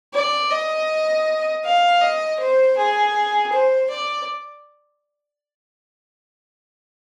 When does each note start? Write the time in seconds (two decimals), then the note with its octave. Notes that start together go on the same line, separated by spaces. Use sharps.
0.14 D5
0.51 D#5
1.65 F5
2.02 D#5
2.39 C5
2.78 G#4
3.53 C5
3.90 D5